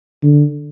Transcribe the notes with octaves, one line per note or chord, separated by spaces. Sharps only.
D3